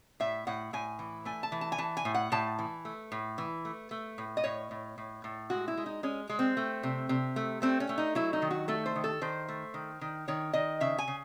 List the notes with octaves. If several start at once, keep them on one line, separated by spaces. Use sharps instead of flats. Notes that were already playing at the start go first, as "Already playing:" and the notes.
A2 E5
A2 F#5
A2 G#5
E3
A3 G#5
A5
E3
A5
G#5
E3 A5
G#5
A2
F#5
A2 A5
E3
A3
A2
E3
A3
A3
A2
D#5
A2 C#5
A2
A2
A2
G#3 F#4
E4
G#3
D#4
G#3 C#4
G#3
C4
A3
C3
C3
A3
A3 C4
C#4
A3
D#4
F#3 E4
D#4
D#3
F#4
A3 A4
C5
D#3
A4
D#3 C5
A3
D#3
D#3
D#3 C#5
D#3 D#5
C#3 E5
G#5
C#3